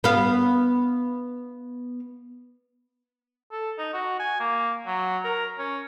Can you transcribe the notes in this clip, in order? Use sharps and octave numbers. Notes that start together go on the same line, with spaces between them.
B3 F5
A4
D#4
F#4
G#5
A#3
F#3
A#4
C#4